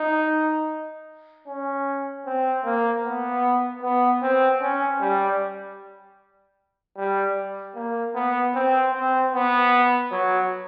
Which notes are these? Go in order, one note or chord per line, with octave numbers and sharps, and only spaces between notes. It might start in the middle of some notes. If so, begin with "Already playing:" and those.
Already playing: D#4
C#4
C4
A#3
B3
B3
C4
C#4
G3
G3
A#3
B3
C4
C4
B3
F#3